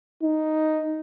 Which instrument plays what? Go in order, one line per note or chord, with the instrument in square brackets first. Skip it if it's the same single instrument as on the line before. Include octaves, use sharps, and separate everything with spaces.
[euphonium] D#4